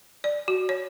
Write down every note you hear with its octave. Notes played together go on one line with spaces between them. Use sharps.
D5
F#4
C#5